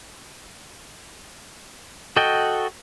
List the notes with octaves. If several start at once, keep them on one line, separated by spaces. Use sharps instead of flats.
F#4 A4 D#5 G5